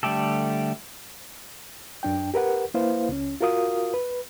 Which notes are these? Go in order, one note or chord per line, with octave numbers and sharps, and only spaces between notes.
D3 G3 A3 G4 A4
F#2 D4 G5
G4 A#4 B4 F#5
A#3 E4 B4 C5 F5
C#2 C#4
F4 F#4 A#4 F5 D#6
B4